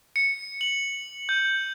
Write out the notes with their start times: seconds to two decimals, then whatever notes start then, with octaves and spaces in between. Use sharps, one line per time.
0.16 C#7
0.61 F#7
1.29 G6